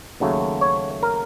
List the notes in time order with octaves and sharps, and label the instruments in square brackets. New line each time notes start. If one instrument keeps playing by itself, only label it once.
[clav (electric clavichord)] D#2 C#3 F#3 A3
C#5
A#4